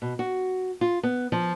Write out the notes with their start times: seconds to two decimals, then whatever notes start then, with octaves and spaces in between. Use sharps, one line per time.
0.02 B2
0.19 F#4
0.81 F4
1.03 B3
1.32 F3